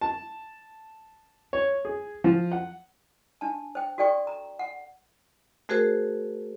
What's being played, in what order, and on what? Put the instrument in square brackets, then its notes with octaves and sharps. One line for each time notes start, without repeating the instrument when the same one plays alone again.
[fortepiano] A5
C#5
G#4
F3
F#5
[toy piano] D4 A5
C5 G5
F#4 A4 D5 G5 C#6
A#5
F#5
[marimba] A3 F#4 G#4 A#4 C5